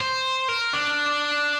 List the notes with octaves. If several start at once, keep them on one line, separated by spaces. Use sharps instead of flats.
C5
A#4
D4